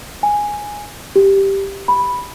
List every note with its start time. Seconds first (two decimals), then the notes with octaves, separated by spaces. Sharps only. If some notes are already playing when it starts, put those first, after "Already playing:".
0.23 G#5
1.16 G4
1.88 B5